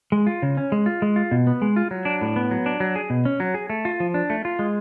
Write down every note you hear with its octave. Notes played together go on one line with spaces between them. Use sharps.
G#3
F4
C#3
C#4
G#3
F4
G#3
F4
B2
B3
G#3
F4
F#3
D4
A2
B3
F#3
D4
F#3
G#4
B2
C#4
F#3
G#4
A3
F4
F3
D4
A3
F4
G#3